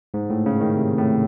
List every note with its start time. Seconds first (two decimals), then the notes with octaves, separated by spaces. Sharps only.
0.14 G#2
0.30 A2
0.46 C#3
0.61 D#3
0.77 C3
0.98 A2